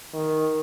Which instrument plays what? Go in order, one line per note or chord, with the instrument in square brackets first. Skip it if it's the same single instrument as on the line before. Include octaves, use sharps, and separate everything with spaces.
[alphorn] D#3